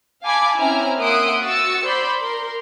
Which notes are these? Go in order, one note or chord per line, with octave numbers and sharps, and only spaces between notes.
F5 G#5 A5 B5 D6 G#6
C4 C#4 E4 G#5 A#5 F6
A#3 E5 F#5 C6 D#6 D7
F#4 C#6 E6 A6 C#7
C5 D5 B5 C6 G6
A#4 C6